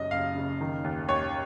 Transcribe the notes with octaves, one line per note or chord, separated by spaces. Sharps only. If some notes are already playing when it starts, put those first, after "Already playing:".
Already playing: F#1 F#2 D#5
F#1 F5
C#3
D#3
D#2
D#2 C#5